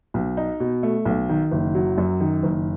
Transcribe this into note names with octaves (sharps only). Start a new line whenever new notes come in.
B1
D#4
B2
A3
B1
D#3
F#1
F#3
F#2
D#3
F#1